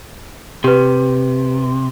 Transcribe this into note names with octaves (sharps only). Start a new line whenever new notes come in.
C3 G4 B4